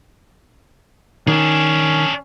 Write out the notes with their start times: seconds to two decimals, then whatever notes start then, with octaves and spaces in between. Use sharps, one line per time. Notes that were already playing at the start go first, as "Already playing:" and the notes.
1.28 D#3 C#4 D4 G#4